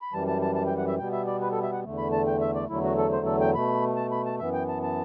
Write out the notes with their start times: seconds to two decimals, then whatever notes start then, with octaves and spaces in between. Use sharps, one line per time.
0.02 B5
0.13 F#2 E3 G3 A5
0.28 A5
0.42 A5
0.55 A5
0.67 G5
0.77 F#5
0.87 E5
0.98 B2 G3 B3 G5
1.12 E5
1.27 D5
1.41 B4
1.52 A4
1.63 E5
1.73 F#5
1.84 E2 D3 A3
1.98 B5
2.12 A5
2.27 G5
2.41 E5
2.55 D5
2.69 E2 D3 F#3 A3 E4
2.83 F#4
2.97 A4
3.12 C5
3.26 A4
3.41 G5
3.55 B2 A3 B5
3.97 A5
4.12 B5
4.25 A5
4.39 F#2 E3 B3 E5
4.53 G5
4.68 A5
4.83 A5